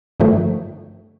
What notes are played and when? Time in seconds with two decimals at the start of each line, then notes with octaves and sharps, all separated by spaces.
0.20 G2 D3 D#3 F3 A3